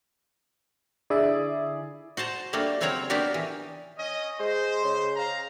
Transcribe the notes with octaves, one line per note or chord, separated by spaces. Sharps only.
D3 E4 G#4 D5 E5
F#4 C5 A5 A#5
G3 A3 A#3 D4 F#4
C#3 F#3 C4 A#4 C#5 A#5
A#3 B3 D4 F#4 G4 A#4
E3
C#4 D#5
G#3 C5
C#3
F5 A#5